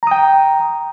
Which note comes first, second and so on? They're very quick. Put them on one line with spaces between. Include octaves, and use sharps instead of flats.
A#5 D#6 G5